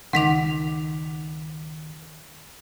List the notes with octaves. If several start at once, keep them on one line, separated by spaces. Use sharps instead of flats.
C#2 D#3 D#4 F#5 D6 B6 F7